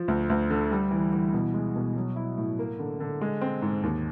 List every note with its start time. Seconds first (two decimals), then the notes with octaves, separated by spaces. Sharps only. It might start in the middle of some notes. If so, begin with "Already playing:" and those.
Already playing: F3
0.08 D2
0.30 D2
0.50 D3
0.71 G3
0.91 E3
1.13 E3
1.33 B2
1.54 G#3
1.75 B2
1.96 F#3
2.16 E4
2.38 A2
2.59 A#3
2.79 D3
3.00 D3
3.21 G#3
3.41 C4
3.62 G#2
3.83 D#2